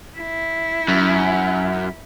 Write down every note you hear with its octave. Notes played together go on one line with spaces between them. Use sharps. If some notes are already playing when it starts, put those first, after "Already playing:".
E4
F#2